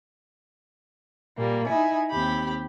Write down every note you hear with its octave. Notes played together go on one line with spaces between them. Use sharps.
A#2 G3 A#3
D#4 E4 G#5
D#2 C4 G4 B5